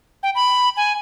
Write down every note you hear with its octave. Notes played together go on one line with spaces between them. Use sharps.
G5
B5
G#5